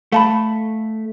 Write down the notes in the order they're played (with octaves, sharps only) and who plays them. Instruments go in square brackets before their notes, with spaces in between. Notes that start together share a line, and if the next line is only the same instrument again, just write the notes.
[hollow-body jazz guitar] A3 [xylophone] F5 A5 B5